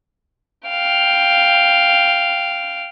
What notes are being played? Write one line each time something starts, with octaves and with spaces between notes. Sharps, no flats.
F5 G5